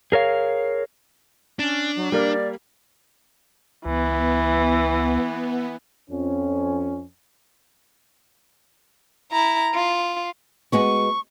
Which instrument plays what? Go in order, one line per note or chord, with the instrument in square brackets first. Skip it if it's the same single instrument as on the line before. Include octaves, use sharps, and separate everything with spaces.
[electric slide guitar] G#4 A#4 C#5 F5
[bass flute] C#4 [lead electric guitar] D4
[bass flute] F#3
[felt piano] G3 A#3 A#4 [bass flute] D5
[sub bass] C#2 [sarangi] E3 [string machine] B3
[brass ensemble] F2 C#4
[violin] E4 A#5
F4
[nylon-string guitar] G#3 B3 F#4 [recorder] C#6